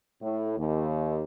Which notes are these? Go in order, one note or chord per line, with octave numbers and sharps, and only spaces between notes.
A2
D#2